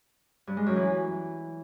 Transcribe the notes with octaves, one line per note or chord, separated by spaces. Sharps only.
G2
G#3
F#2
E3